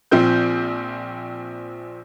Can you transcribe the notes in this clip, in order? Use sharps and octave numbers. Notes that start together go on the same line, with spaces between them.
A#1 F3 C4 G6